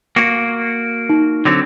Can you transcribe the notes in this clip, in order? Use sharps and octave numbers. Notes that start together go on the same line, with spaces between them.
A#3 F#4
D#4
D3 F#3 C4